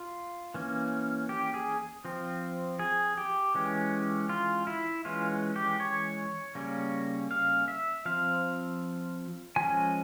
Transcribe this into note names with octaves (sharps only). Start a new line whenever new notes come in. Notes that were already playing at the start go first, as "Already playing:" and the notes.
Already playing: F4
E3 A#3 C#4
G4
G#4
F3 C4
G#4
G4
E3 G#3 C#4
F4
E4
E3 G#3 C#4 F4
G4
C#5
C#3 G3 A#3 C#4
F5
E5
F3 C4 F5
F3 G#3 C#4 G#5